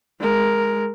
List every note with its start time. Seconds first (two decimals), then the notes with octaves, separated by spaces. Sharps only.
0.20 G#3 A#4